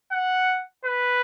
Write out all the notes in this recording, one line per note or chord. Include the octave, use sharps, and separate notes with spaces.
F#5
B4